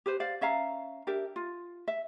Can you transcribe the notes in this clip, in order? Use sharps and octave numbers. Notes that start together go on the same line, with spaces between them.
G4 B4 C5
C5 D5 F5
C#4 E5 F5 A#5
D4 G4 A#4 E5
F4
E5